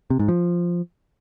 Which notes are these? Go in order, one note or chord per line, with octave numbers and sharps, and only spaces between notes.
C3
G#2
F3